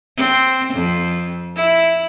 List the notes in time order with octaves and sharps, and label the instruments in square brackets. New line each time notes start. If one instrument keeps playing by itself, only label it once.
[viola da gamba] C4
F2
E4